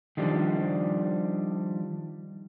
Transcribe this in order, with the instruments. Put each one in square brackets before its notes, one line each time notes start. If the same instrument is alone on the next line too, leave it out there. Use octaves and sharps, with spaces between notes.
[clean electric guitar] D#3 F3 G3 D4